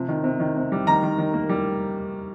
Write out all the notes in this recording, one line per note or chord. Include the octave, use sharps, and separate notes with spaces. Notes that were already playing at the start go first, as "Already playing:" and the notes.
Already playing: C3 F3
D#3
C3
D#3
C3
G3
D#3 A#5
D#3
D#3
A#3
G3